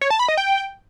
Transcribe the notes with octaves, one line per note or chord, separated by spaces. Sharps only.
C#5
A5
B5
D#5
G5